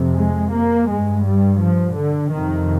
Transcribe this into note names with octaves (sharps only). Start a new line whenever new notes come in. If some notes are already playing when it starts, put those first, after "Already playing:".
Already playing: F2 C3
G#3
A#3
G2 G#3
G3
F3
D3
F2 C3 D#3